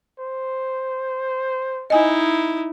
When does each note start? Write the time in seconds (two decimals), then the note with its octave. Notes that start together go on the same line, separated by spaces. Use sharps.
0.19 C5
1.90 D#4 E4 D#5 G#5